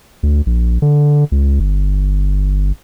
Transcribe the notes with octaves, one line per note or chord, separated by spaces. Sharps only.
D2
A#1
D3
C#2
G1